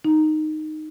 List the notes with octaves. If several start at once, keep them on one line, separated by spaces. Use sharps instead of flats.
D#4